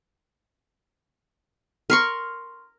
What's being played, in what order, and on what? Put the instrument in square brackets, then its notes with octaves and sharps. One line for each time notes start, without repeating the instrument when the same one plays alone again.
[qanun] A#4 C6 C#6